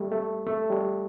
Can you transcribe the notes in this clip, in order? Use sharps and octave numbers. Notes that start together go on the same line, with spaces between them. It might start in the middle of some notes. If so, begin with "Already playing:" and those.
Already playing: G3 A3
A3
A3
G3